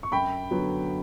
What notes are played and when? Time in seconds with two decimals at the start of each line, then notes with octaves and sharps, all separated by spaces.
0.03 C#6
0.12 F#2 G5 B5
0.51 D3 F#3 B3